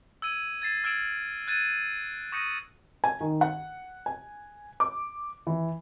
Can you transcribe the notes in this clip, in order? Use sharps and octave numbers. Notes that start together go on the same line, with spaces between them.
E6 G#6 D#7 F#7
G#6 A6 C7 E7
E6 F6 G#6 D7 E7 F#7
F6 F#6 G#6 A6 D#7
C#6 D#6 G6 A#6 C#7 D#7
G#5
D#3
F#5
G#5
D6
E3